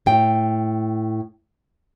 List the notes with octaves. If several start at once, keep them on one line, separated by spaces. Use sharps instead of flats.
A2 G5